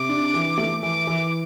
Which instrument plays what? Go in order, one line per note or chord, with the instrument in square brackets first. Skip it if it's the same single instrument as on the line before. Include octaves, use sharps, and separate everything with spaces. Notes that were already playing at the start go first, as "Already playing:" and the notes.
Already playing: [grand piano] C3 [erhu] D6
[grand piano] D4
E3
A3
[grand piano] E3 [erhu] D6
[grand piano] E3